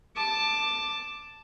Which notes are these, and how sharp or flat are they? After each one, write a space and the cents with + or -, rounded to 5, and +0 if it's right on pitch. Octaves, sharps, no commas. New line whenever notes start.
A5 +0 D6 +10